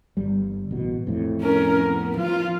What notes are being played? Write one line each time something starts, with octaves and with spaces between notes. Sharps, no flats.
G1 G3
A1 B2
F2 A2
C#4 A#4
B3
F3 F4